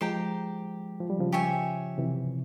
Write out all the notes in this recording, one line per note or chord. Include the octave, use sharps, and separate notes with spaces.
F3 G#3 G4 C5 G5 A#5
F3
G3
C#3 F3
G4 C#5 E5 G#5
C3 E3